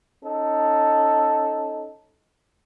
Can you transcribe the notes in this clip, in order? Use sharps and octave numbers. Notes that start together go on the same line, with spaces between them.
C#4 D#4 A4